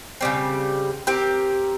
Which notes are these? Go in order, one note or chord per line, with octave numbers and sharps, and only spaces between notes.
C#3 G3 C4
C4 G4 A#4